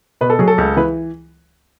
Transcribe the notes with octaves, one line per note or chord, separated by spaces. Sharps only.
B2 B4
A4
F#3 G#4
A4
C#2
E3 B4